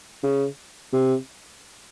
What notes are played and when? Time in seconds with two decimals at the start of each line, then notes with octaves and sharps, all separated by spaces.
0.23 C#3
0.93 C3